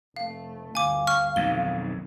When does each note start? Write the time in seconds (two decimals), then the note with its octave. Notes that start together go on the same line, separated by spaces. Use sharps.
0.16 F1 A3 F5
0.75 G1 D2 F5 G#5 D6
1.07 C#6 F6
1.36 B1 F2 D#3 G7